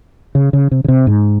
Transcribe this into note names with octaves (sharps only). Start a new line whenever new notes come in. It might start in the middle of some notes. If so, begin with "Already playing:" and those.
C#3
C#3
C3
C#3
C3
G#2